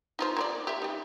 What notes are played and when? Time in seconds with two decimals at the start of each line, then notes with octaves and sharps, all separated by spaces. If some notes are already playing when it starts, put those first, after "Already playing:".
0.19 D#4 F4 C5
0.37 A#3 A#4 D5
0.67 G4 E5
0.82 G3 D#4